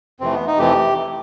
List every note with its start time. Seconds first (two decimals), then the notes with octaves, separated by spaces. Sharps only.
0.20 F2 C3 E3 A3 C4
0.34 B3
0.47 D#4
0.59 F2 C3 E3 A3 G4